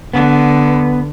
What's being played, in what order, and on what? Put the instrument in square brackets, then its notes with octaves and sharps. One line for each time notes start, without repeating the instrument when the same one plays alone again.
[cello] D3 [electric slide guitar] B3